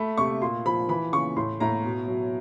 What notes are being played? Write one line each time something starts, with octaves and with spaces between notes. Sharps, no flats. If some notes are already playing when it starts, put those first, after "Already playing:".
Already playing: A3 B5
C3 C#6
A#2 C6
F3 B5
E3 B5
C#3 C#6
A2 C6
A2 A#5
B2
F#3